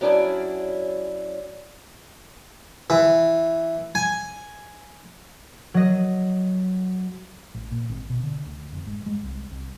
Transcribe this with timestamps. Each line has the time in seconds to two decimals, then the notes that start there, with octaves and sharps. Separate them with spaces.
0.01 F#3 C#4 D4 E4 G#4 D5
2.90 E3
3.95 G#5
5.74 F#3 D#5
7.55 A1
7.71 A#2
7.89 G#1
8.10 B2
8.23 D3
8.46 D2
8.72 F1
8.86 G#2
9.06 G#3
9.24 C2
9.51 C2